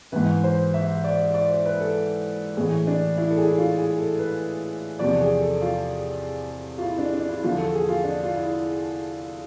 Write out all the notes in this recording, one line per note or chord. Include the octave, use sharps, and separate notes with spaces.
G#2 E3 B4
C5
E5
D5
D5
C5
B4
A4
A2 E3 G#4
D4
E4
A4
G#4
E4
F4
G#4
A4
B4
E2 C3 F3 D5
G#4
A4
F4
F4
E4
D4
D4
E4
E2 D3 F3 F4
A4
G#4
F4
D4
F4
E4